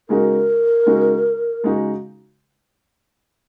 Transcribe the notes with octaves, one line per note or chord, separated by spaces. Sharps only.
C#3 G#3 D#4 F#4 A#4
C#3 G#3 D#4 F#4
C#3 G#3 D#4 F#4